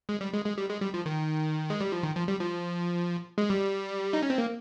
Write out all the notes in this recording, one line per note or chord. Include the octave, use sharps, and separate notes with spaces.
G#3
G3
G#3
G#3
G3
G#3
G3
F3
D#3
G#3
G3
F3
D#3
F3
G3
F3
G#3
G3
D#4
C#4
C4
A#3